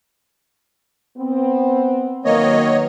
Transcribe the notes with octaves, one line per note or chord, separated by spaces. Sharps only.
B3 C4
D#3 F#3 A#3 B4 C#5 D#5